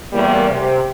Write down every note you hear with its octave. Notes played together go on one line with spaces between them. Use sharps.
E2 A2 G3 A#3
C3